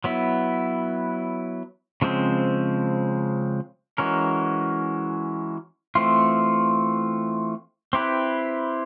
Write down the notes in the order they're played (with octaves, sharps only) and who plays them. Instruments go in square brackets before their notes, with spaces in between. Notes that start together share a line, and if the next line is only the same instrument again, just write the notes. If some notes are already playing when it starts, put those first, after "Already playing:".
[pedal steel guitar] F#3 B3 E4
C#3 F3 G#3 C4
E3 G#3 C#4 F#4 A#4
E3 A3 C4 F4
C4 E4 G4 B4